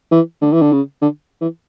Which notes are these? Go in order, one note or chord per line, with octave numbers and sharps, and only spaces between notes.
E3
D3
E3
D3
C#3
D3
E3